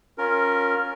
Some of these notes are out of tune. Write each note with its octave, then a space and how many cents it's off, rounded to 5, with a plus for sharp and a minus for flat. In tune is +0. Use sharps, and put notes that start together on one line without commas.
C#4 +0 F4 +25 A#4 +0